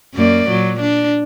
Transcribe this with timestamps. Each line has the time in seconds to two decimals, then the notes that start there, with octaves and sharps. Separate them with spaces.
0.15 F#2 A#3 D5
0.49 A#2 F#3
0.80 D4